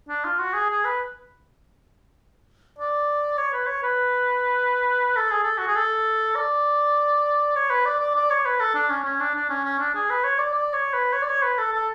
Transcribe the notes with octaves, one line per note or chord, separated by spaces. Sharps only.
D4
F4
F#4
G#4
G#4
B4
D5
C#5
B4
C#5
B4
A4
G#4
A4
F#4
G#4
A4
D5
C#5
B4
D5
D5
D5
C#5
B4
A4
D4
C#4
C#4
D4
D4
C#4
C#4
D4
G#4
B4
C#5
D5
D5
C#5
B4
C#5
D5
C#5
B4
A4
A4